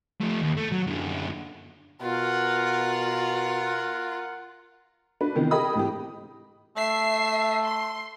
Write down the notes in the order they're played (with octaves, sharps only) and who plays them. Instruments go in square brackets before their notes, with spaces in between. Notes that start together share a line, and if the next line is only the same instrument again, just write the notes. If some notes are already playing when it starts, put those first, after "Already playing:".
[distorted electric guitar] F3 A3
D#2
A3
F#3
F#2 D3
[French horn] B2 [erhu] F4 [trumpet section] A#4 F#5
[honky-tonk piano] D4 F#4 B4
C3 D#3 E3 B3
G4 G#4 A#4 D#5 B5 D#6
G#2 E3 C4 G4
[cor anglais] A3 [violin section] E5 C7
[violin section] C6